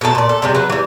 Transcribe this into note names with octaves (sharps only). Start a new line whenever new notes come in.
B2 A3 D#4 A5
A#2 D5
A4
C3 G3 G#3
F#3 B4
E3 G3